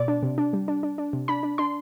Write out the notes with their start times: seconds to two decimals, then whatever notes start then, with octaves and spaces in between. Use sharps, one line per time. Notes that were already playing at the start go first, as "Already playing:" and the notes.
Already playing: B2 D5
0.08 D4
0.23 C3
0.38 D4
0.53 G3
0.68 D4
0.83 D4
0.98 D4
1.13 C3
1.28 D4 B5
1.43 D4
1.58 D4 C6